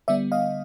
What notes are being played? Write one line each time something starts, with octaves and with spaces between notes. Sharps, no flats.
D3 G3 B3 D5 E5
D#5 F5